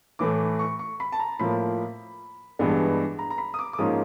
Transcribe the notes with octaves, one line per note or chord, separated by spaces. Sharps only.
A2 E3 A3 D6
C#6
C#6
B5
A5
A#5
A2 F3 A#3 B5
G2 E3 G#3 B3 D4
A#5
A#5
B5
D#6
D6
D6
G#2 F3 A#3 C#4 D#6